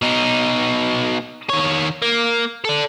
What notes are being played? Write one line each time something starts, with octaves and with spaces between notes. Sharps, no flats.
B2 D#4
D#3 C#5
A#3
A4 D5